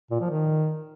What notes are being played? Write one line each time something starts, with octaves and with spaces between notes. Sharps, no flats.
A#2
F3
D#3